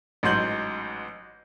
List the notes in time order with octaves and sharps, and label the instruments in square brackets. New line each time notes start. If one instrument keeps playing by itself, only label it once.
[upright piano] A1 G#2 F#3 C6 G6 F#7